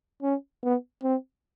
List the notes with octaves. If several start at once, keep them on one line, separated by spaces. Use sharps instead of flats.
C#4
B3
C4